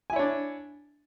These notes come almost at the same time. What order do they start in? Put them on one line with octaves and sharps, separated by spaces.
G#5 E4 C#5 D4